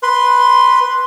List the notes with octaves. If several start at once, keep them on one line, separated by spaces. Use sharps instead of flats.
B4 C6